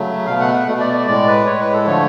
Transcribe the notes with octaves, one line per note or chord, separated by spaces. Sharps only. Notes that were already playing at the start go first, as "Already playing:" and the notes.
Already playing: C#3 F#3 A3
B2 A3 F5
F#5
F#5
B2 A3
D5
D5
A2 G#3 D5
B4
A2 G#3 C#5
B4
A4
D3 F3 A3 C#5